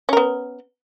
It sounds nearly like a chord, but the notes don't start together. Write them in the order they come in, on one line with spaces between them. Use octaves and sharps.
C#4 A#4 B3